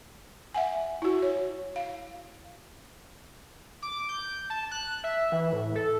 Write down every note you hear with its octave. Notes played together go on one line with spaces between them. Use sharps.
E5 F#5 G#5
E4 F#4
C#5
F5
D6
G6
A5
F#6
E5
E3
A2
A4